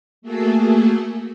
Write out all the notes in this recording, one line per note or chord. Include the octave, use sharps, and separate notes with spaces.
A3 A#3 F#4 G#4 A4